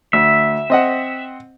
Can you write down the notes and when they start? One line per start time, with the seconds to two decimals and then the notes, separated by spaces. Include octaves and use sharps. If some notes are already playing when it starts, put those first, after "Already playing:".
0.13 D2 E5
0.70 C4 D#5 F#5